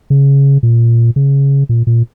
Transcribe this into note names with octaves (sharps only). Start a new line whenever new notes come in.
C#3
A#2
C#3
A#2
A#2